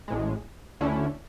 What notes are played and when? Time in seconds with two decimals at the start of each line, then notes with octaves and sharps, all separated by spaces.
0.08 A1 A2 G#3
0.81 D2 D3 A3 C#4 E4